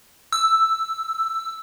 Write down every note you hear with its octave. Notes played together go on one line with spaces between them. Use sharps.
E6